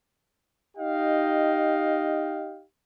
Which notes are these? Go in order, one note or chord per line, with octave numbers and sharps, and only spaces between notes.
D#4 G4 D#5 F5 G5